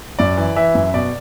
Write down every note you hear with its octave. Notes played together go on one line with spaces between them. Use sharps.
F#2 D5
E3
E3 E5
F#2
B2 D5